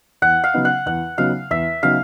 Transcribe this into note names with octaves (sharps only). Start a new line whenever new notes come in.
E2 F#5
F5
C#3 F#3 B3 D#4
F#5
E2 F#5
C#3 F#3 B3 D#4 F5
E2 E5
C#3 F#3 B3 D#4 F5